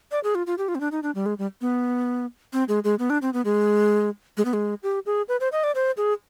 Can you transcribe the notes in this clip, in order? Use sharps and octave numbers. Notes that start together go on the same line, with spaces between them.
D5
G#4
F4
F4
G4
F4
C4
D4
D#4
D4
G3
G#3
G3
B3
C4
G#3
G#3
B3
D4
C4
B3
G#3
G#3
B3
G#3
G4
G#4
B4
C5
D#5
D5
C5
G#4